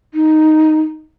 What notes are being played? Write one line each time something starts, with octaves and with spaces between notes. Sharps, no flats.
D#4